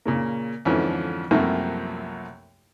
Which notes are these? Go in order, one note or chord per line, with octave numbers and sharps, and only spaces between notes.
A#2 C#3 A#3
F2 G#2 D3 E3 F3 C#4
C2 F#2 C3 F3 A3 A#3